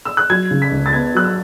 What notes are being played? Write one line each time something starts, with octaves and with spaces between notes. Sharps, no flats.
E6
F#6
F#3 G#6
C#3
B6
C#2
A6
B3 G#6
F#3 F#6
E6